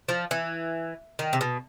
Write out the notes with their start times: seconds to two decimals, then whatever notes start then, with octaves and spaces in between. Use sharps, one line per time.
0.09 F3
0.31 E3
1.19 D#3
1.33 C3
1.41 B2